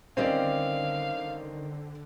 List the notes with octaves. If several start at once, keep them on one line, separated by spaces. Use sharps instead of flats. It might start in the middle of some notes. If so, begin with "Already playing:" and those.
D3 D#3 G3 C4 C#4 G4 D5 F5